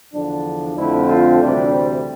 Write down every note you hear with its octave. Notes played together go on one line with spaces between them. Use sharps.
E2 D3 F3 D4
F2 D3 A3 C4 E4
F4
D2 C3 E3 G3 D4
C4